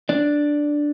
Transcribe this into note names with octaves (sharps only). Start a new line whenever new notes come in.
D4 D5